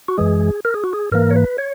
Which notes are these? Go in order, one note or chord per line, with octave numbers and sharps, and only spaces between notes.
F#4
F#2 E3 G#3 G#4
A#4
G#4
F#4
G#4
G#2 E3 A#3 A#4
C#5
B4
C#5